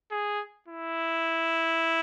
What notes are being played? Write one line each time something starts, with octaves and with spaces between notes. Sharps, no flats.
G#4
E4